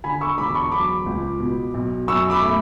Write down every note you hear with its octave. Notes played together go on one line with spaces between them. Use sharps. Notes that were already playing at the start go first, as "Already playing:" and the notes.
D3 G#5 B5
C#6 E6
E1 B5 D6
A5 C#6
F#3 B5 D6
C#2
B2
B1
F#2 C#6 E6
B5 D6
A3